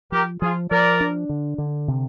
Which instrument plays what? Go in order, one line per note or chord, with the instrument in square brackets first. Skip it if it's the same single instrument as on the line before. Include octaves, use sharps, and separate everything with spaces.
[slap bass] F3 [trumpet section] G4 A#4
[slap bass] F3 [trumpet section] F4 G#4
[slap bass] F3 [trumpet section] A#4 D5
[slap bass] D4
D3
D3
C3